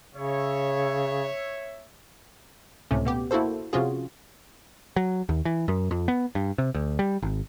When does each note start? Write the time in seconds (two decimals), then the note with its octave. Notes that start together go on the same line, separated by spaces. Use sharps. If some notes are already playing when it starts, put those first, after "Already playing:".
0.15 C#3 C#5 E5
2.91 C#2 A2 C3 A3 C#4
3.05 B2 B3 G4
3.31 A#3 E4 F#4 A4 C5
3.73 C3 F3 C#4 F4 F#4 G#4
4.96 F#3
5.29 D#2
5.45 E3
5.68 F#2
5.91 F2
6.08 B3
6.35 G2
6.58 C3
6.74 D2
6.99 G3
7.22 G#1